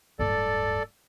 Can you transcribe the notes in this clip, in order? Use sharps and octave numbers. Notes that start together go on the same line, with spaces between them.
D1 G2 A4 D5